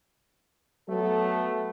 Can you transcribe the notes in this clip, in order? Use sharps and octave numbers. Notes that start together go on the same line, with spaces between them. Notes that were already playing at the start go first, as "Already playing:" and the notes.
F#3 A3 B3 A4